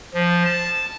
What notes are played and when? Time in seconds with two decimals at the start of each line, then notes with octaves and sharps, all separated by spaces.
0.14 F3
0.45 A5